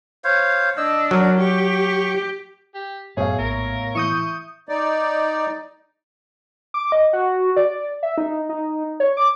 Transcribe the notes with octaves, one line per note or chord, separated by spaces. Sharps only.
C5 C#5 F5
D4 D#5 E6
F#3 A#4
G4 C#6
G4
F#2 A2 B3 G#4 C#5 E5 F5
A#1 A#4
E3 E5 C#6 D#6 G6
D#4 D5
D6
D#5
F#4
D5
E5
D#4
D#4
C#5
D6